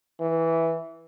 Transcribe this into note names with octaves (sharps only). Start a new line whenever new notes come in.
E3